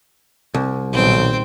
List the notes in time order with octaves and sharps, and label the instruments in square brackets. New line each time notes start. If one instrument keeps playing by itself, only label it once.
[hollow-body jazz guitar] C2
[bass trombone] B1 [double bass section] A#2 D#3 G3 [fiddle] C4 G5